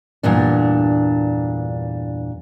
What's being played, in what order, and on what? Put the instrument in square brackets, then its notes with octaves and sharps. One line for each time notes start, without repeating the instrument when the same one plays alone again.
[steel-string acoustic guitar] E2 G2 A#2 D4